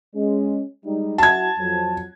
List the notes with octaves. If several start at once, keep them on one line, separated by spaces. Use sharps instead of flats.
G#3 C#4
G3 G#3 D#4
F#3 E4 F#4 A5 G#6
F2 F#3